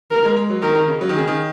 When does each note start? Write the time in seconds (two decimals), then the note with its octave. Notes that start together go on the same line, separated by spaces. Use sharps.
0.11 A#4
0.24 G#3
0.37 G#3
0.50 F#3
0.62 D#3 A#4
0.75 D#3
0.88 C#3
1.01 F#3
1.09 D#3
1.14 C#3 G#4
1.28 D#3